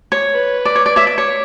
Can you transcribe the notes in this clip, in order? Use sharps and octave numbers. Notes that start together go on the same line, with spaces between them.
C#5
B4
D5
C#5
D5
C#5 E5
D5
C#5